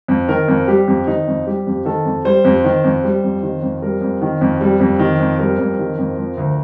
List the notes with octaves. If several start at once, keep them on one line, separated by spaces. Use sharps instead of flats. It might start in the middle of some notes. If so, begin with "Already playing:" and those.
F2
D#3 A#4
F2
G3 G4
F2
D#3 D#4
F2
G3 G4
F2
D#3 A4
F2
G3 C5
F2
D#3
F2
G3
F2
D#3
F2
G3 A#4
F2
D#3
F2
G3
F2
D#3
F2
G3 A#4
F2
D#3
F2
F3
D2